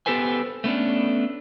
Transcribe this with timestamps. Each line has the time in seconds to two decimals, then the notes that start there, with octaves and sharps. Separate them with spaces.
0.06 B3 G4 A4 B4 C5 G#5
0.64 A3 B3 C#4 D4